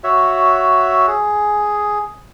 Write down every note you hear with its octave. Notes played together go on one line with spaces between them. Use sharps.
F#4 C#5 E5
G#4